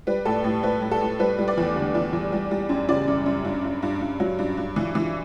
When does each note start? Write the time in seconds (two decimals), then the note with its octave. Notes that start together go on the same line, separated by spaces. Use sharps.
0.07 G3 B4
0.25 A2 A4
0.44 A2
0.63 A2 B4
0.82 A2
0.91 A4
1.01 A2
1.19 G3 B4
1.38 G3
1.48 D5
1.57 E2
1.76 D3
1.95 E2
2.13 E2
2.32 G3
2.51 G3
2.69 F#2
2.88 C#3 D5
3.07 F#2
3.26 F#2
3.45 G2
3.64 G2
3.83 G2
4.01 G2
4.20 F#3
4.39 G2
4.57 G2
4.76 E3
4.95 E3